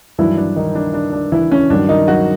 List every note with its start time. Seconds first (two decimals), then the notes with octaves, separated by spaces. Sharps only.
0.18 G2 D#3 E3 F#3 E4
0.37 D4
0.56 D#3 D#4
0.75 D4
0.94 D4
1.13 D4
1.32 E3 E4
1.51 C#4
1.70 G2 D#3 F#3 D4
1.89 D#3 D#4
2.08 F#3 F#4